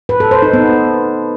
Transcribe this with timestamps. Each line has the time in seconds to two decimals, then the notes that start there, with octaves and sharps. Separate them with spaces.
0.09 B4
0.20 A4
0.31 C5
0.42 D#4
0.53 B3